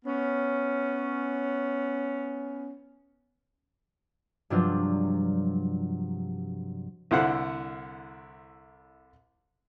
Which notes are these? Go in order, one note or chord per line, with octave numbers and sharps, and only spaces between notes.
B3 C#4
G2 C3 F3 F#3 D4 F4
C2 D3 E4 C5 F5 F#5